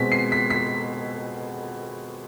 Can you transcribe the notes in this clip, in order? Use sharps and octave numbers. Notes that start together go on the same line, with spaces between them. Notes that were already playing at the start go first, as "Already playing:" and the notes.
Already playing: B2 G#3 C4 B6
C7
B6
B6